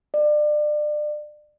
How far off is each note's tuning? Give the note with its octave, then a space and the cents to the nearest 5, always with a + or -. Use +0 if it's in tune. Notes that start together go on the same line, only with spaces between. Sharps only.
D5 +30